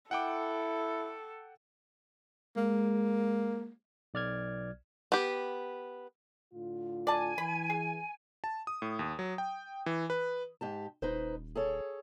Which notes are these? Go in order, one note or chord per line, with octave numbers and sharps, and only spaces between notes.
E4 A4 F#5 G5 D6
G#3 A#3
B1 D5 F6 G#6
B3 G4
A2 D3 F4
D5 G#5 A5
E3 B5
G#4
A5
D#6
A2
D#2
F#3
G5
E3
B4
G#2 G4 A5
D#1 D#4 B4 C5
G#4 A4 C#5